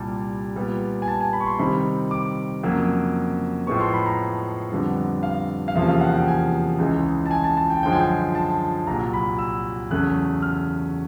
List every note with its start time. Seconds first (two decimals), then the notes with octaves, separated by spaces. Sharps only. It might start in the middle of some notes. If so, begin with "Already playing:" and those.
Already playing: C2 A#2 G3 A5
0.55 A#2 G3 B3
1.02 G#5
1.08 A5
1.21 G#5
1.33 B5
1.41 C#6
1.46 C6
1.59 C3 D#3 G3 C4 B5
2.11 D6
2.63 F2 C#3 F#3 A#3
3.67 A2 F3 G#3 B3 C#6
3.81 C6
3.93 B5
4.06 A#5
4.71 F2 D3 G3 B3
5.23 F5
5.68 F5
5.75 E2 C3 F3 A#3 C#4 E5
5.88 F5
6.01 F#5
6.14 G5
6.28 G#5
6.79 C#2 C#3 E3 G#3
7.26 A5
7.31 G#5
7.44 A5
7.57 A5
7.70 G5
7.83 F#2 D3 F3 G#3 G5
7.92 G#5
8.01 G5
8.35 A5
8.87 C2 A#2 F#3 A#5
9.14 B5
9.39 E6
9.91 E2 C#3 F#3 A3 F#6
10.43 F6